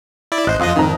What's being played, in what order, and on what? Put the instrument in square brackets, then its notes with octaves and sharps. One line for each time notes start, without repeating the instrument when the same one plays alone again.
[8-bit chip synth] E4 D5
[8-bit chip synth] A1 C5 [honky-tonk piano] D#5 F#6
[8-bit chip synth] F2 F3 D#5 [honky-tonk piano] F5 C6 D#6
[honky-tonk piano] G#1 F2 A#5 [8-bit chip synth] D#3